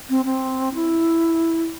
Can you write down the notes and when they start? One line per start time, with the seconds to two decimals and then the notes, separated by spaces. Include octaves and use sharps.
0.10 C4
0.25 C4
0.75 E4